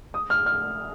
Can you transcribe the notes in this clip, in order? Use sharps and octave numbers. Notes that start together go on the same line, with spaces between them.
D#6
F6
F6